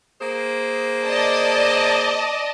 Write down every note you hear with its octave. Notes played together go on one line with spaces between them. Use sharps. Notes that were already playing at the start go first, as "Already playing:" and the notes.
A#3 G#4 C5
D5 D#5 A5